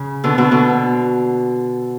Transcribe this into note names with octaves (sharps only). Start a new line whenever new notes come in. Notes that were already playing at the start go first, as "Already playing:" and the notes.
Already playing: C#3
B2 D3
B2 D3
B2 D3